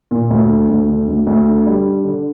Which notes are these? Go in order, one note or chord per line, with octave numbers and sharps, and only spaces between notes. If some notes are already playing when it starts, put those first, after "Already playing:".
A#2
D2
D3
D2
D3
D2
D2
D3
G3
D4
D3